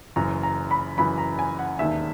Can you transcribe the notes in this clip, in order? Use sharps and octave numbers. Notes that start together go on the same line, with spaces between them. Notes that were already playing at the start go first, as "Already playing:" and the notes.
F#1 F#2 E3 A#5
A#5
B5
F#1 F#2 E3 B5
A#5
G#5
F#5
E1 D#2 D#3 E5